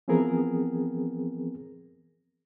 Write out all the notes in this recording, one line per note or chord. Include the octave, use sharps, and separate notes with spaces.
E3 F3 B3 C4 G#4 A#4